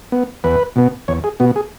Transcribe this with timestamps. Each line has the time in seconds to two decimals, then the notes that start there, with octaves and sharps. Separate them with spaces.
0.12 B3
0.44 E2 B4
0.76 B2 B3
1.08 E2 C#5
1.24 G#4
1.40 B2 B3 F#4
1.56 G#4